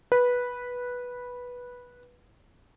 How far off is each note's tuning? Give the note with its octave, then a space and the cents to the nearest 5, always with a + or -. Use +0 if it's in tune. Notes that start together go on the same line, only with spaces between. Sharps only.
B4 -10